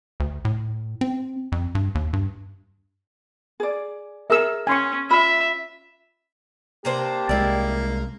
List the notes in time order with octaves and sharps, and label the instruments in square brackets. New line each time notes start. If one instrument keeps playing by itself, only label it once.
[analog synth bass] D2
A2
C4
F2
G2
D#2
G2
[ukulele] G#4 D5
[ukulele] G#4 A#4 [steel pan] E5 E6
[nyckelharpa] C#4 [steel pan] G#5 C6 C#6
[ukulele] F4 B5 [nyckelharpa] E5
[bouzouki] C3 D4 C5 [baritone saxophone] A#3 [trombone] G4
[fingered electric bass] C2 G#3 [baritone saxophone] A#3 [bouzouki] E4 D5